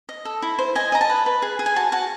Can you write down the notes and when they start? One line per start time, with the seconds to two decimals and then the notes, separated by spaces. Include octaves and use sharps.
0.09 D#5
0.25 A4
0.42 E4
0.59 C5
0.75 D#5 G#5
0.92 D#5 A#5
1.01 A5
1.10 B4
1.26 B4
1.42 G#4
1.59 G#4
1.66 G#5
1.76 F#4 A5
1.92 F#4 A5